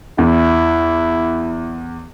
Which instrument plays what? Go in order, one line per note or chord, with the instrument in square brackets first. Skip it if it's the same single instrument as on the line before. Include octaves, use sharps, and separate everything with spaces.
[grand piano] E2 [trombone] E4